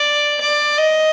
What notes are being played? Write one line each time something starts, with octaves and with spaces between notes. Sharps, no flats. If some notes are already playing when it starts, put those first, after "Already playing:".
Already playing: D5
D5
D#5